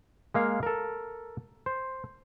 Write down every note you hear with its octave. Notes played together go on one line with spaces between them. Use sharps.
G#3 A#3 F5
A4 A#4
C5